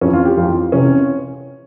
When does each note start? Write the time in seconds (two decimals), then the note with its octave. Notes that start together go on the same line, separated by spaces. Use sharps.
0.01 F2 E3 C#4
0.13 F4
0.25 G4
0.37 F2 E3 F4
0.72 C3 E3 C#4